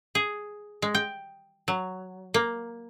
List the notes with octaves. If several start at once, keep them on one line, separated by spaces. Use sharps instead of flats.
G#4
G#3
G5
F#3
A#3